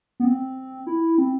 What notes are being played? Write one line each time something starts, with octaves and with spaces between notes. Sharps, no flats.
B3
C4
E4
C4